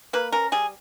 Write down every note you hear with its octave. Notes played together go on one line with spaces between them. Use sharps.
A#3 B4
C#4 A#4
G3 G#4